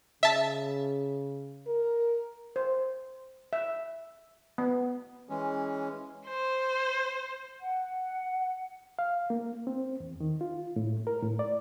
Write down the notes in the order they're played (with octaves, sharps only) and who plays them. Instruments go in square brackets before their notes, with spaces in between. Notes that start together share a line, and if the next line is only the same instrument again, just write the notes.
[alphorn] C#3 [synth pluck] E5 A5
[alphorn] A#4
[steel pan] C5
E5
B3
[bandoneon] E3 G#3 C#4
[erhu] C5
[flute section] F#5
[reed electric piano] F5
A#3
C4
E2
D#3
F4
A2
A#4
A2
D5